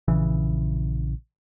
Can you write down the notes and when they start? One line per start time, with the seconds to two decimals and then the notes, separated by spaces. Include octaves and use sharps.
0.08 A#1 C#3 E3